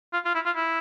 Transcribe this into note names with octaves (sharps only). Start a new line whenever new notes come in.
F4
F4
E4
F4
E4